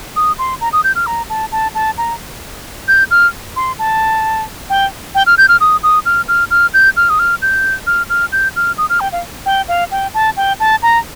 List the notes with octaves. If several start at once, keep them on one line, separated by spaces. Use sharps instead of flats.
D#6
C6
A#5
D#6
G6
F6
A#5
A5
A5
A5
A#5
G6
F6
C6
A5
G5
G5
F6
G6
F6
D#6
D#6
F6
F6
F6
G6
F6
D#6
F6
G6
F6
F6
G6
F6
D#6
F6
G5
F5
G5
F5
G5
A5
G5
A5
A#5